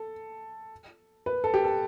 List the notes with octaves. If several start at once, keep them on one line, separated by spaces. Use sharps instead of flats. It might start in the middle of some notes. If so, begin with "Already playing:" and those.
Already playing: A4
B4
A4
G4
A4